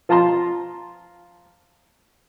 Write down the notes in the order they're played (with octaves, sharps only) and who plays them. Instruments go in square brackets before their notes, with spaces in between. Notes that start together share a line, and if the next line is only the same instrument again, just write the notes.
[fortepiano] F3 F4 A5 A#5 C6